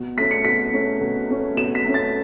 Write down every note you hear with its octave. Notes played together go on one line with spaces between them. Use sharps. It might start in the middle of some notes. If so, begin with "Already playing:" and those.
Already playing: B2
A3 C#4 B6
C#7
B2 B6
A3 C#4
B2
A3 C#4
B2 E7
B6
A3 C#4
A6